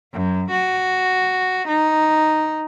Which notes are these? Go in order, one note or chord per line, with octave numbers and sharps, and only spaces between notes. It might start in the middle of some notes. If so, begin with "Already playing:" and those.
F#2
F#4
D#4